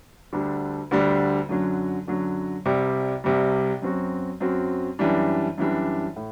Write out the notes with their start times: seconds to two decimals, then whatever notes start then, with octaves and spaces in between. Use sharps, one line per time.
0.33 D2 D3 G3 D4
0.91 D2 D3 G3 D4
1.49 F#2 D3 F#3
2.08 F#2 D3 F#3
2.66 C2 C3 G3
3.24 C2 C3 G3
3.82 F#2 F#3 C4 F#4
4.40 F#2 F#3 C4 F#4
4.99 F#2 E3 G3 D4
5.58 F#2 E3 G3 D4
6.16 A2